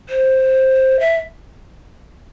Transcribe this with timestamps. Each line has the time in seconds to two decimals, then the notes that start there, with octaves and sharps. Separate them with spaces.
0.09 C5
1.00 E5